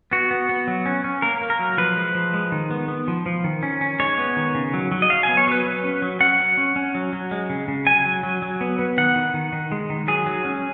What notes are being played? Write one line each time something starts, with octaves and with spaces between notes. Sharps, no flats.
B3 F#4
B3
B3
F#3
C#4
C#4
A#3 A#4
A#3
A#4
F#3
F3 B4
G#3
F3
G#3
D#3
B3
B3
F3
F3
D#3
C#4
C#4
G#3 C#5
B3
D#3
C#3
F#3
F#3
D#5
F#3 F5
G#5
B3
C#5
F#3 B4
F#3
C#4
F#3
C#4 F#5
F#3
C#4
C#4
F#3
F#3
G#3
C#3
C#3
F#3 G#5
F#3
F#3
F#3
B3
B3
D#3 F#5
D#3
D#3
D#3
G#3
D#3
F#3 G#4
F#3
C#4